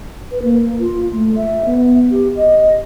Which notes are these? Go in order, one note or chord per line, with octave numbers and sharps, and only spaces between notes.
B4
A#3
F4
A3
E5
B3
G4
D#5